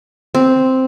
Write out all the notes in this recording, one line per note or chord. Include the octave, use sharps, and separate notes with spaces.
C4